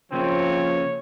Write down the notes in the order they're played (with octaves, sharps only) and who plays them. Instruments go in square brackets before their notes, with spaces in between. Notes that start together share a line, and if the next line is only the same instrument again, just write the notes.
[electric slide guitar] C#3 A#3 C#4 [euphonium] F3 [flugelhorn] C4 [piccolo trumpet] C#5